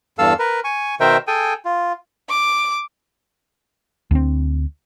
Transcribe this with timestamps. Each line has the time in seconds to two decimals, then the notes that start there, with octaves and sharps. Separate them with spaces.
0.19 E2 G2 A4 F5 E6
0.39 A#4 B4
0.64 G#5 C#6
1.00 B2 D#3 A#4 C5 E5 G5
1.27 G#4 A4 G5 G#5
1.65 F4
2.29 D6
4.11 D2 C4